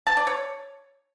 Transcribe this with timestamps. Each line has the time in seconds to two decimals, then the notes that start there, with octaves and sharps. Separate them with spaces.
0.07 A5
0.17 D5
0.27 C#5